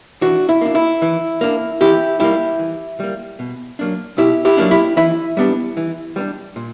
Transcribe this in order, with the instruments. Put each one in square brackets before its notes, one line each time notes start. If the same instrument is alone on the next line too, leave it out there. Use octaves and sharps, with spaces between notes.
[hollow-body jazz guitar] E3 D4 F#4
E4
A#3 D4
E4
E3
A#3 D4
E3 E4 G4
G3 A#3 E4 G4
E3
G3 A#3
B2
F#3 A#3 D4
B2 E4 G4
E4 G4
F#3 A#3 D4
E4 G4
E3 E4
G3 B3 D4
E3
G3 B3 D4
A#2